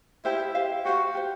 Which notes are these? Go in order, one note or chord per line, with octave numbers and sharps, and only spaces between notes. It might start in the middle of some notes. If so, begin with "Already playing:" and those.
E4 G4 C5 F5
G4 C5 F5
F#4 G4 C5 F5
G4 C5 F5